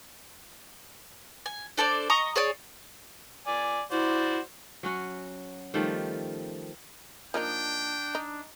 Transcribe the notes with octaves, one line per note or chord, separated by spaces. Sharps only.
G#5
D4 A4 C5 D5
D#5 A#5 C#6 D#6
G#4 C#5 D5
D5 G#5
E4 F#4 C5 D5
F#3 C#4 F#4
D#3 F3 G3 A3
F3 A#3 D4 D#4 G5
D#4